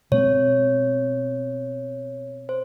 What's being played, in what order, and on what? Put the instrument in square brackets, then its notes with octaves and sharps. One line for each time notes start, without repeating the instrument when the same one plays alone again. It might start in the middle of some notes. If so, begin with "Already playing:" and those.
[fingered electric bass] B2 G#3 C4 [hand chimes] C#5
[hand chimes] C5